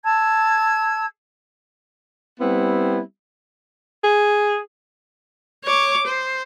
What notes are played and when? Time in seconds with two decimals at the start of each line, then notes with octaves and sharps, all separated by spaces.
0.04 A5 E6 G#6
2.40 G3 B3 C4 E4
4.04 G#4
5.65 C#5 D6
6.07 C5